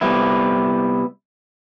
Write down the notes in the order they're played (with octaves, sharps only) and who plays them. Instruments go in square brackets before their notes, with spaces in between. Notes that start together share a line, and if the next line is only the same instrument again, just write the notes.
[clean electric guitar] C2 G3 B3 E4